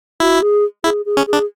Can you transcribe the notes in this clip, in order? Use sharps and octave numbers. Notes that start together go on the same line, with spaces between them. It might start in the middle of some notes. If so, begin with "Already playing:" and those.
E4 F#4
G#4
E4 G#4
G#4
C#4
G#4
D4